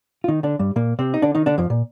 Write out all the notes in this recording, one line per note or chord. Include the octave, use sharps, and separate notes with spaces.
F4
D#3 D#4
D3 D4
G2 G3
A#2 A#3
C3 C4
D#4
D3 D4
D#3 D#4
D3 D4
F2 F3
A#2